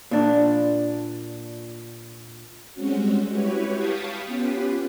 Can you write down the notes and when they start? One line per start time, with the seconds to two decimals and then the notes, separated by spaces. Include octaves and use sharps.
0.11 A#2 D4
2.74 G3 G#3 C4 C#4 F#4
3.29 E4 F#4 G4 B4 C#5
3.74 F5 G5 A5 B5 C#6 D#6
4.27 B3 C#4 F4 G4 B4